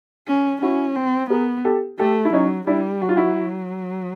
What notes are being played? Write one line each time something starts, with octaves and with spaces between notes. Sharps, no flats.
C#4
C#4 E4 F#4
C4
B3 G#4 A#4
G4 A4
A3 G4 A4
E4
F#3 C#4 D#4
G3 D4 E4
F#3 F#4
F4
E4 F#4